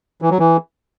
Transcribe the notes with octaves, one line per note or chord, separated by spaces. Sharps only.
E3
F#3
E3